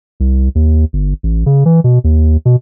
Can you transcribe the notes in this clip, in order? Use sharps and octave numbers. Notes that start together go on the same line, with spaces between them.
C2
D#2
G1
A1
C#3
E3
B2
D#2
B2